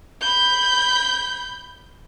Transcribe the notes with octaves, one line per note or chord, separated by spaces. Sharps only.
B5 G6